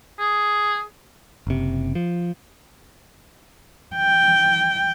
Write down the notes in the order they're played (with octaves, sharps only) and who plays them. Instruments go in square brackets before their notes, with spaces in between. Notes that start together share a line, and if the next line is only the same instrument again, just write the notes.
[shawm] G#4
[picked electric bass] F#1 C3
F3
[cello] G5